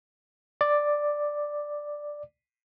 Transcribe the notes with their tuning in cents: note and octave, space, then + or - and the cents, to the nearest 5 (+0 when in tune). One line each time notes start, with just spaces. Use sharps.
D5 +5